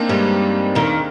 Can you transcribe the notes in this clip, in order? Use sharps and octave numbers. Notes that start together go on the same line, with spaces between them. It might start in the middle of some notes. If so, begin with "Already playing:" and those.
Already playing: A#3 C4 D4 D#4
G2 G3 G#3
D#2 D#3